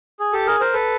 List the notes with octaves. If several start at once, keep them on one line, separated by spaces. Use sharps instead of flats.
G#4
G4 A4
G#4 A#4
A#4 C5
A4 B4